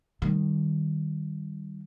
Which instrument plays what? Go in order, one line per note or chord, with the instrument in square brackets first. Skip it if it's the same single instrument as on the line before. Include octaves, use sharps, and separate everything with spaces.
[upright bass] D#3 G3